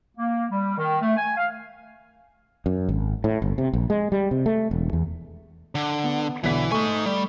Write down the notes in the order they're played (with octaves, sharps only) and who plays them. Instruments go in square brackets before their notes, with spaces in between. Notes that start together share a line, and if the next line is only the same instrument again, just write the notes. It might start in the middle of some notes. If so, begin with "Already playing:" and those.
[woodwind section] A#3
G3
D#3
A3
G#5
F5
[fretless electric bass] F#2
G#1
A2
G1
C3
A#1
G#3
G3
C3
A3
E1
E2
[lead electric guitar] D3
[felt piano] B3
[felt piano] B1 D3 B6 [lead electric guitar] E3
[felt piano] A3 C#6 [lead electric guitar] D#4 G#5
[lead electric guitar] G3